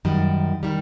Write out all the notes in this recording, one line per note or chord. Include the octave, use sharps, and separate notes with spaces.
F#2 D#3 G3
D#3 G3